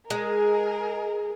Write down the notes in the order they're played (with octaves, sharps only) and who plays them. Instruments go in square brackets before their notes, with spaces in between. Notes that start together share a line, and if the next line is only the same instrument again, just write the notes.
[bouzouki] G#3 [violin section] G#4 A#4